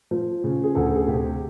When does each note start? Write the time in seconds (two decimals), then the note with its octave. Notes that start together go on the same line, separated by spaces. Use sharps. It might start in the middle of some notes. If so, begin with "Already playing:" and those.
0.11 F3
0.44 C#3
0.64 G#4
0.75 D2 A4
0.96 G#4
1.07 C3 G4